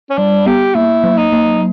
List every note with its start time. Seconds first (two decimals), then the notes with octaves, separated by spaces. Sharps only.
0.10 C#4
0.18 G3 D4
0.46 B3 G4
0.75 A#3 E4
1.04 F#3
1.18 D#4
1.32 A#3